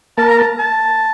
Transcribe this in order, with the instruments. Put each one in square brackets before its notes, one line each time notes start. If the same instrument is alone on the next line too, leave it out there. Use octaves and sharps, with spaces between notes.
[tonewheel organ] A#3 A#4 [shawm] A5
[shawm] A#5
A5
A5